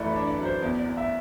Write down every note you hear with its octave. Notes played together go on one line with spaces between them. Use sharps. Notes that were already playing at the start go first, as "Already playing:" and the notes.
Already playing: F#2 E3 A3 B4 D5 E5
D5
D4
D5
F#2
C5
E2 D5
D5
E2
E5